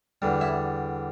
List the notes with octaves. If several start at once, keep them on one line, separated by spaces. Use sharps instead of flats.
E2 D3 G3
E4 E5